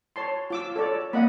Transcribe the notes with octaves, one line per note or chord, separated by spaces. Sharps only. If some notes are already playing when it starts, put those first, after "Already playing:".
C#5 A5 C6
F4 D6 E6
A4 C#5 D5
A#3 D#5 F5 F#5 B5